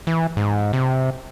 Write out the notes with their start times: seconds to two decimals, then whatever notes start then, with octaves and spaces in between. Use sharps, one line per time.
0.07 E3
0.37 G#2
0.73 C3